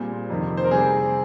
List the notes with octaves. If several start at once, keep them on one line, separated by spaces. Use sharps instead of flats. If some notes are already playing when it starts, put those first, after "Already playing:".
Already playing: A#2 G3 C4 G#4 C5
F2 C3 D#3
C5
A#4
C3 G3 C4 G#4